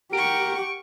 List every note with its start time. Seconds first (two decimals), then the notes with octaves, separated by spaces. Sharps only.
0.13 G4 A#4 F#5 C#6 D7